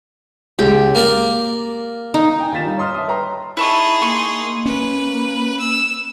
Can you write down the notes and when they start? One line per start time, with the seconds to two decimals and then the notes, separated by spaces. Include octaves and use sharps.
0.59 C#2 G4
0.95 A#3 A#4 D5
2.14 D#4
2.40 G5 G#5
2.52 D#2 F4 A#5 A6 B6 E7
2.64 G3 D#4
2.77 C#5 D#5 C6 D#6 F6
2.94 E5 A5 C6 D#6
3.08 B4 C#5 G5 A#5 C6
3.57 D#4 E4 G#4 A5 C#6
4.02 A#3 G#5 C6 C#6
4.65 A#3 C#4 B4
5.59 E6